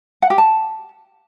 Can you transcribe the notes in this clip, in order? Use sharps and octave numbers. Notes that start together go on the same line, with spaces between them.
F#5
G4
A5